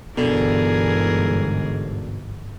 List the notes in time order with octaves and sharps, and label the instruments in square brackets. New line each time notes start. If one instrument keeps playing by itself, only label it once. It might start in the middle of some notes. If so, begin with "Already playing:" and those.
[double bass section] G1 G#2 [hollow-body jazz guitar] B2 [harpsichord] D3 [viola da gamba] E3 G#4 A#4